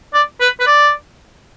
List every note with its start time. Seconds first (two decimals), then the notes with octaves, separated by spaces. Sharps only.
0.14 D5
0.41 B4
0.60 B4
0.67 D5